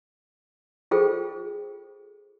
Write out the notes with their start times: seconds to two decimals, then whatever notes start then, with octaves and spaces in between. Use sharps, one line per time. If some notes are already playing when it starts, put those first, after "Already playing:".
0.91 F4 G#4 A4 C5 G5